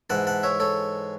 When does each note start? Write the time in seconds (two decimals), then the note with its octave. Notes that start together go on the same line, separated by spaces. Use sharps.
0.10 G#2 E3 F#5 A5
0.27 F#5 A5
0.43 C#5 E5
0.60 A4 C#5